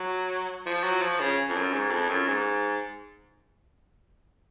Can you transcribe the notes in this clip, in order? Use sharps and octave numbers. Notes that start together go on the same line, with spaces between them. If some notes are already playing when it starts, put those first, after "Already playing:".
Already playing: F#3
F3
F#3
F3
C#3
F2
F#2
G#2
F2
F#2
G#2